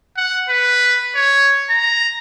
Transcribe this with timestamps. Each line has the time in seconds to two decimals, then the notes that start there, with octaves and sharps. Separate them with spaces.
0.17 F#5
0.49 B4
1.15 C#5
1.70 A#5